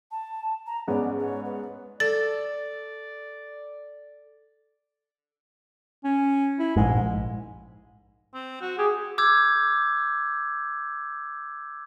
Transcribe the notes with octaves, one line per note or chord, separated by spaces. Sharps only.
A5
A#5
G#2 B3 C#4 D5
C#5
B4
A4 D5 A6
C#4
E4
A#1 G#2 G#3
C4
F#4
G4 G#4
D6 E6 G6 G#6